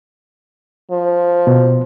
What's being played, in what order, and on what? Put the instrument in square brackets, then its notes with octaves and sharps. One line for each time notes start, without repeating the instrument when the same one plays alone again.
[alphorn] F3
[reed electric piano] B2